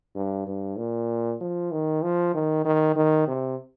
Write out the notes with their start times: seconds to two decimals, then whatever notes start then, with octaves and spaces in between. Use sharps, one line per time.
0.16 G2
0.47 G2
0.78 A#2
1.40 F3
1.72 D#3
2.03 F3
2.34 D#3
2.65 D#3
2.96 D#3
3.27 C3